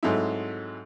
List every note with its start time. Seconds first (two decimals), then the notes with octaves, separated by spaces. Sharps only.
0.03 G#2 F#3 A3 C4 D#4 E4